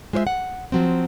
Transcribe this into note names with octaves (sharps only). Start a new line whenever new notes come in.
G#3 F4 C5 C#5 E5
F#5
F3 F#3 C4